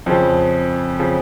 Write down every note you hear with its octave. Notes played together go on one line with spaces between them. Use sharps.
F2 C#3 F3
C#3 F3